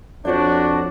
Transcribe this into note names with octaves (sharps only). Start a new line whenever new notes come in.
F2 D4 F#4 C#5 D5